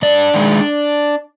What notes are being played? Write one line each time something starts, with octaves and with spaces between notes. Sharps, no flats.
G2 D4 D5
D#3 G#3